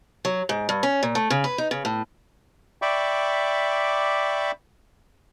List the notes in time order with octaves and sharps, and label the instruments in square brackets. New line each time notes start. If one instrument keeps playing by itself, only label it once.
[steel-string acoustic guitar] F#3
G#2
G2
C#4
A#2
A3
C#3
B4
D#4
C#3
A2
[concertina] D5 E5 G5 B5 C#6 D6